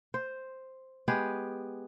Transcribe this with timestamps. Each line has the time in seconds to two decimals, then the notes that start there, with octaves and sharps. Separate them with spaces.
0.14 C5
1.08 G#3 B3 G4 G#4